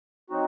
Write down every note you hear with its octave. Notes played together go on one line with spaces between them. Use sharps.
F#3 C4 D#4 F#4